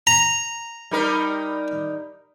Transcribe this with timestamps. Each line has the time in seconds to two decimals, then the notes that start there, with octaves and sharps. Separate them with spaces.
0.07 A#5
0.91 G3 D#4 A#4